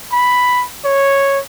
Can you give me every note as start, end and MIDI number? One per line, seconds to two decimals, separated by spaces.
0.12 0.65 83
0.85 1.39 73